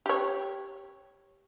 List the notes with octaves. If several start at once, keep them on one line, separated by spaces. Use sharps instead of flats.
G4 C#5